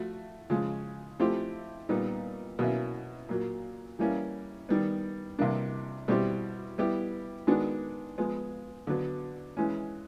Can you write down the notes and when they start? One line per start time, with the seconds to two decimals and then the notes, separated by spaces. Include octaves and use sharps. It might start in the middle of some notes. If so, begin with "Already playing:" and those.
Already playing: F3 A3 F#4
0.50 C#3 F3 G#3
1.20 F3 A3 C4 E4 G4
1.89 A#2 G3 B3 D#4
2.59 B2 F#3 A#3 C#4 E4
3.29 A#2 F#3 A#3
3.99 E3 G3 A#3 C#4 E4
4.69 D#3 G3 B3
5.39 C3 E3 G3 A#3 D4
6.08 B2 G3 C4 E4 G4
6.78 G3 B3 E4 G4
7.47 D#3 G#3 B3 D4 F#4
8.18 F3 G#3 B3
8.87 D3 F#3 B3
9.57 E3 G#3 C#4